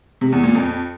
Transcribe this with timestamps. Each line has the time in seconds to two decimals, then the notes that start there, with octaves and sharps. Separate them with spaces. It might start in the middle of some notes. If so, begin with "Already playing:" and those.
0.21 C3
0.32 E2
0.44 A#2
0.55 F2